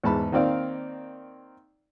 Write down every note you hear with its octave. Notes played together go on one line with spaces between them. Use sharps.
E2 G#2 A5 B5
D#3 A#3 C4 D5 F5